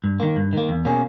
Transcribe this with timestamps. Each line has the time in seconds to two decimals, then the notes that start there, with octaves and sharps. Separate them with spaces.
0.04 G2
0.20 D#3 A#3
0.36 G2
0.53 D#3 A#3
0.69 E2
0.85 B2 A#3 C#4 G#4